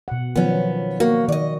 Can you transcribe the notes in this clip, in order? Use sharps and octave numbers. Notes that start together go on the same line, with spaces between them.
B2 F#5
D#3 F3 F#3 B3 C#4
A#3 F#4
D#3 D5 D#5